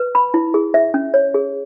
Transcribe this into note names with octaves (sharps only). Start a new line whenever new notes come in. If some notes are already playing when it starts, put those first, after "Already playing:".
Already playing: B4
B5
E4
G#4
E5
C#4
C#5
G#4